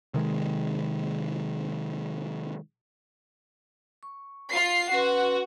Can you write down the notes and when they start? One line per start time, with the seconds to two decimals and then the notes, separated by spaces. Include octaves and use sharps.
0.14 C3 D#3 G#3
4.03 C#6
4.49 F4 C7
4.92 C#4 F#4 B4 C6